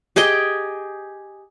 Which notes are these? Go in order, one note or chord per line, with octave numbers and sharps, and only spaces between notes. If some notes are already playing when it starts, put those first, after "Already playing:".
G4 G#4 D#5 G5